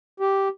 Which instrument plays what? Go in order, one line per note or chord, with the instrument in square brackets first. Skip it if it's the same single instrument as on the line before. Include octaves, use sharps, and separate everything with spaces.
[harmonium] G4